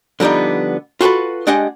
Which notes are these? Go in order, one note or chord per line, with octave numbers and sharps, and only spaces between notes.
D3 F3 G3 B3 D#4
F4 F#4 G#4 A4 B4
G#3 D4 G4 D#5 F#5 G#5